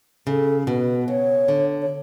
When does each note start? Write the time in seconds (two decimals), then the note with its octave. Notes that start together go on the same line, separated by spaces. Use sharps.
0.27 C#3 A4
0.67 B2 B4
1.08 C#3 C#5
1.48 D3
1.82 C#5